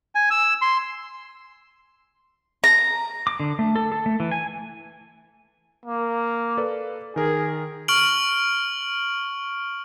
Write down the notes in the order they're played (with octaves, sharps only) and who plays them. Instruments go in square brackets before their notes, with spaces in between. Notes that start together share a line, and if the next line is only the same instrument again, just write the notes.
[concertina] G#5
E6
C6
[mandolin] A#5
[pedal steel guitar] D6
D3
A3
A4
A4
A3
E3
G#5
[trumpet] A#3
[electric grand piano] A4 B4 D5
[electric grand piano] D#3 A#4 [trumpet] G#4
[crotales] C#6 F6 D7 F#7